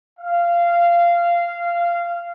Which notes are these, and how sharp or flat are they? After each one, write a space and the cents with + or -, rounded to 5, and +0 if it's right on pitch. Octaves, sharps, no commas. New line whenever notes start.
F5 -15